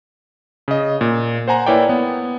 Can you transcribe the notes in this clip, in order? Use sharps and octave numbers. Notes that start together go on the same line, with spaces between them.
C#3 D#5
A#2
C5 F#5 G#5 A#5
A#3 E4 B4 C#5 D5 G5
B3